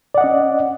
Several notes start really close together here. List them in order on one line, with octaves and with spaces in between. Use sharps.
D5 F#5 D#5 C#4